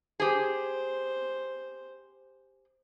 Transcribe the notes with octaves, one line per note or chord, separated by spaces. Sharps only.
G4 G#4 C5